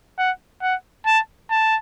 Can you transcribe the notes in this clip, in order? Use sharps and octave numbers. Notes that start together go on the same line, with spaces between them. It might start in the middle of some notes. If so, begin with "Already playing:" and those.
F#5
F#5
A5
A5